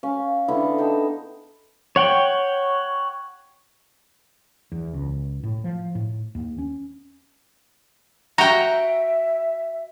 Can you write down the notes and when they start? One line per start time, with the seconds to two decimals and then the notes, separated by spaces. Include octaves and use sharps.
0.03 C#4 F5
0.48 D3 B3 E4
0.78 D#4 G5 A5
1.96 C#5 F#5 G5
4.72 E2
4.93 C#2
5.44 A2
5.64 F3
5.95 A2
6.35 D#2
6.58 C#4
8.38 F#4 E5 G5 A#5